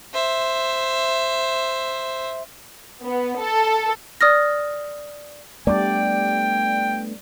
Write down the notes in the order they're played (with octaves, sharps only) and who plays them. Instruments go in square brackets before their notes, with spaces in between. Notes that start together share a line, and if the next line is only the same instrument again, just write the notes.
[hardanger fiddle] C5 E5
[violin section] B3
A4
[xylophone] D5 D#6 F6 A#6
[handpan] G3 D5 [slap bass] A3 B3 D4 [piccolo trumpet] G5